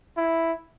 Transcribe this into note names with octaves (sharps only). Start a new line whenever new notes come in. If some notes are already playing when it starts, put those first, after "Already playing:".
E4